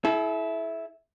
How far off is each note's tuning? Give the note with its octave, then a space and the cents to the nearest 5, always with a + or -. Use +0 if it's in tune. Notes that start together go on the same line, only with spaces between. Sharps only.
E4 -5 A4 -45